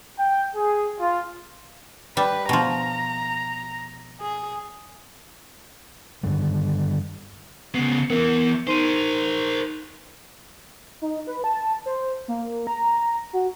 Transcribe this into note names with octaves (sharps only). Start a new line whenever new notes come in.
G5
G#4
F4
G3 B4
B2 F3 A#5
G#4
G2 D3 D#3 G3
C#3 B3 C7
E3 B3 A#4
D#4 A#4 C5 C6 D#7
D#4
B4
A5
C5
A#3
A#5
F#4